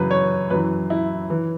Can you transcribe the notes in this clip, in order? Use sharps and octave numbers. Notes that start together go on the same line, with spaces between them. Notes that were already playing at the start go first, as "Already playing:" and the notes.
Already playing: F#2 C#3 E3 B4
C#5
F#2 E3 B4
E4
E3